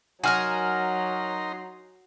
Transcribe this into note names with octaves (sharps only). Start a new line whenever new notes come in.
F#3 D#4 F#4 A#4 G#5 A#5 C6 F6